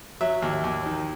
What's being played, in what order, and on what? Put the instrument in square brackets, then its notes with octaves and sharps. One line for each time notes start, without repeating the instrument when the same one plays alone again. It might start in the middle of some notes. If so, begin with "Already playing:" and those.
[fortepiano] F#3 E5
D#2
D#2
D#3